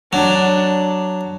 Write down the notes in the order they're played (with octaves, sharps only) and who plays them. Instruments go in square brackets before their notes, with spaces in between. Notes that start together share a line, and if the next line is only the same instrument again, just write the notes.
[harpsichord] F#3 [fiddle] D4